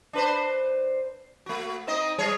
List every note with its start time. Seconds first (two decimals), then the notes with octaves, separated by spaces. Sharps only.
0.13 D4 B4 C5
1.46 A3 F#4
1.87 C4 D#4 D#5
2.18 G3 G#4 C#5